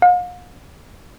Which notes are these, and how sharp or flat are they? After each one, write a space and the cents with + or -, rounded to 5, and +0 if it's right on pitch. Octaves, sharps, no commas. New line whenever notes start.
F5 +45